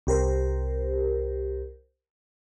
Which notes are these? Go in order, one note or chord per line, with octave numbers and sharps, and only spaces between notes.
C2 G4 A#4 C5